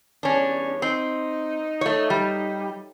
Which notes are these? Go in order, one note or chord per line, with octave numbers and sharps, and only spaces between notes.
E2 G3 C#4 D4 C#5
C4 D#4
A3 C#5
G3